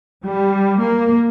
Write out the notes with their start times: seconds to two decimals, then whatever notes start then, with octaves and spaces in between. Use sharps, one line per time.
0.25 G3
0.80 A#3